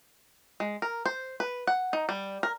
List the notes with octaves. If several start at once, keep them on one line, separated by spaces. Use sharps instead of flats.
G#3
A#4
C5
B4
F#5
D#4
G3
A#4